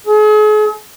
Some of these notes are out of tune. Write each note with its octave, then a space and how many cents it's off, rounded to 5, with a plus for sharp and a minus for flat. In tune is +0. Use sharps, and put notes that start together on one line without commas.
G#4 +40